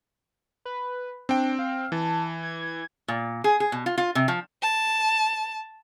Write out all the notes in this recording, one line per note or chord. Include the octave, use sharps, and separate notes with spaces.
B4
C4 D4 G5
F5
E3 A5
G#6
A#2
G#4
G#4
B2
F4
F4
C3
F3
A5